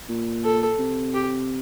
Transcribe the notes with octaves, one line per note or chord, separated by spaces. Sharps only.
A#2
A4
C3
G4